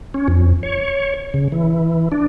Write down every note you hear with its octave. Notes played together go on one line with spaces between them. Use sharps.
C#4
F2
C#5
C#3
E3
D4